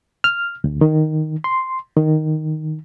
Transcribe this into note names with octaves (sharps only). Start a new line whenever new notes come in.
F6
D2
D#3
C6
D#3